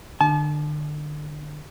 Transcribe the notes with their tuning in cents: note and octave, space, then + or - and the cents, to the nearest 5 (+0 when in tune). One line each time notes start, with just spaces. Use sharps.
D3 +30 A5 -40